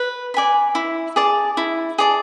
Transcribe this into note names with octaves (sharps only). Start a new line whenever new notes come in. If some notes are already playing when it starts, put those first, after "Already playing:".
Already playing: B4
D5 G#5 B5
E4
G#4 D5 A5
E4
G#4 D5 A5